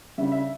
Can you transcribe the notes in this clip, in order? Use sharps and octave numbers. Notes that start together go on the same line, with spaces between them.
C#3 G3 E5
E5